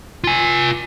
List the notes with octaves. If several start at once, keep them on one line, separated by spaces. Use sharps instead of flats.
F4 G#5